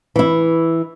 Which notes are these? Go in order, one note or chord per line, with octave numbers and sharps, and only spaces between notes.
E3 E4